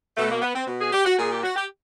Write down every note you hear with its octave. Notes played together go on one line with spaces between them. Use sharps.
B2 A3
A#3
B3
C4
B2
G#4
G4
F#4
A#2 G#4
G4
F#4
G4